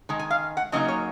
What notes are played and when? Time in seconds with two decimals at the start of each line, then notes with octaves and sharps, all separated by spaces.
0.09 D#3 G#3
0.19 G#5
0.31 F5
0.57 F#5
0.72 C#3 F#3 A#3 D#4 D#5
0.88 C#5